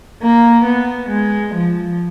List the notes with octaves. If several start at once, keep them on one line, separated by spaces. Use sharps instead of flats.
A#3
B3
G#3
F3